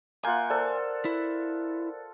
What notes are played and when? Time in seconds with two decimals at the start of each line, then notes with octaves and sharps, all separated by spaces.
0.25 A#3 F4 E5 F#5 G#5 G6
0.50 A4 A#4 C5 D5
1.05 E4